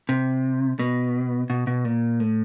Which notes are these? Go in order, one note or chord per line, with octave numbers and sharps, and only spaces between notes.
C3
B2
B2
B2
A#2
A2